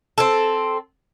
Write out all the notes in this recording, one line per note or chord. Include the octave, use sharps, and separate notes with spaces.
C4 A4